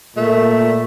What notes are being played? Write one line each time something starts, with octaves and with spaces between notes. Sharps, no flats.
A#2 A3